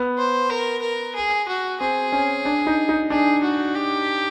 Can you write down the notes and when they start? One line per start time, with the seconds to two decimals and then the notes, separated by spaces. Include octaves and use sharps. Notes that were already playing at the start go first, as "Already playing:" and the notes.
Already playing: B3
0.18 C5
0.50 A#4
0.82 A#4
1.15 G#4
1.48 F#4
1.81 C4 G#4
2.12 C#4
2.45 D4
2.67 D#4
2.89 D#4
3.10 D4 G#4
3.44 F#4
3.75 G4